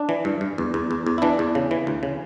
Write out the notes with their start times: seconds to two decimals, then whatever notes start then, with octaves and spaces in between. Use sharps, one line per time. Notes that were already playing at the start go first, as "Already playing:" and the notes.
Already playing: D4
0.09 E3
0.25 G2
0.41 G2
0.58 E2
0.74 E2
0.91 E2
1.07 E2
1.18 E4
1.22 E3 D4
1.39 E2
1.55 C#3
1.71 E3
1.87 D2
2.03 C#3